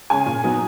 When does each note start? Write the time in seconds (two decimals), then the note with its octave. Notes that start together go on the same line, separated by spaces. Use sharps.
0.10 C#3 G#3 C#4 G#5
0.26 A#2
0.44 F#3 B3 D#4